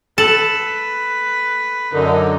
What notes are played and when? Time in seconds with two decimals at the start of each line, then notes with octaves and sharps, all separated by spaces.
0.18 A4 B4 E7 F#7
1.93 F#2 D3 D#4 A#4